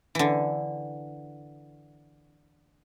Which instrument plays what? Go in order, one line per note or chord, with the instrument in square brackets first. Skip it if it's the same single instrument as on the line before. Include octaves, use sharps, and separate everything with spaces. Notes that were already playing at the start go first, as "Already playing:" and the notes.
[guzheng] D3 E3